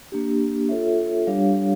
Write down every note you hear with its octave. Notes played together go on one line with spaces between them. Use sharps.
A#3 D4 G4
F4 A4 C#5 E5
G3 D4 G4 C#5 F5